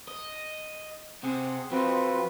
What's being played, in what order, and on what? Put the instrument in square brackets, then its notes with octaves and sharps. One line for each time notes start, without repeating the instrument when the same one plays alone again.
[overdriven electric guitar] D#5
[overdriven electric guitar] C3 [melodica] C4 G#4 F#5
[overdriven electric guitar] F2 [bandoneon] C4 F#4 [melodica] F4 B4